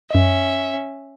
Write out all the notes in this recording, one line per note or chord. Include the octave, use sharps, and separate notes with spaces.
F#2 C#4 D#5 E5